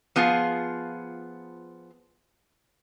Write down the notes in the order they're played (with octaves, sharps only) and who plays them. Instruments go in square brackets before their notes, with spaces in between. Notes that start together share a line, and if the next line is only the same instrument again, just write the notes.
[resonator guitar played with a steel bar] F3 B3 F4 G#4